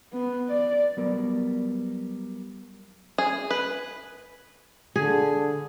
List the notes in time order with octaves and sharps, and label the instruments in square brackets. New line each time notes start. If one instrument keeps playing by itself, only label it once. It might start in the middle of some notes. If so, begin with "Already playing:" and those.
[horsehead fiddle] B3
D5
[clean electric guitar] F#3 G3 B3 A#4 D5
[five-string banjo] G#4
B4
[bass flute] D3 [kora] G#4